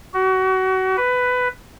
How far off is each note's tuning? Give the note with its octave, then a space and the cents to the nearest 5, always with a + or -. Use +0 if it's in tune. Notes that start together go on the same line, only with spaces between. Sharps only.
F#4 +30
B4 +15